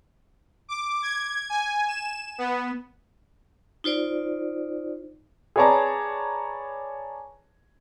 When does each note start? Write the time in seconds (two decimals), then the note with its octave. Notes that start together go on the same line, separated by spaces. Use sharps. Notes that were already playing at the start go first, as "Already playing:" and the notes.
0.69 D6
1.02 G#6
1.50 G#5
1.88 E7
2.38 B3
3.84 D#4 F4 C5 D5
5.56 G#4 B4 C#5 D5 A5 A#5